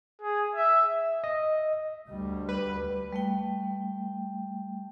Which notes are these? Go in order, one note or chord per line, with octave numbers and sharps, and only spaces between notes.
G#4
E5
D#5
D2 G3
B4
G3 A3 G5